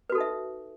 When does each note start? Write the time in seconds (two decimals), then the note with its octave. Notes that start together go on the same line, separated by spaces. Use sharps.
0.10 B4
0.12 F#4
0.15 A4
0.18 D#4
0.21 E5